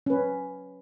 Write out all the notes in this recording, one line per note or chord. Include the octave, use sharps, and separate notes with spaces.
C#4 B4